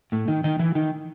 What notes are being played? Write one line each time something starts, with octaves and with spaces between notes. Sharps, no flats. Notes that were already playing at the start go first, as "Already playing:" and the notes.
A2 A3
D#3 D#4
D#3 D#4
E3 E4
D#3 D#4